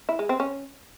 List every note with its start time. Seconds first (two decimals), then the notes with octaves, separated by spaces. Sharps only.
0.09 E4
0.19 G#3
0.29 C4
0.40 C#4